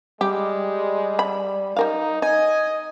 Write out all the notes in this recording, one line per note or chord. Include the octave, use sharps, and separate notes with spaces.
G3 G#3 G4
B5
G3 D#4 A#4 F5
D#4 D#5 G#5